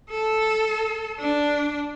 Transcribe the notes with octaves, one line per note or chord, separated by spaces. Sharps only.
A4
D4